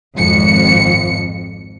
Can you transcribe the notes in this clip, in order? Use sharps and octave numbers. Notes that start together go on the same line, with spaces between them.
G#1 F2 C#7